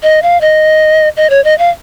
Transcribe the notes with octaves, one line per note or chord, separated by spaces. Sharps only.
D#5
F5
D#5
D#5
C#5
D#5
F5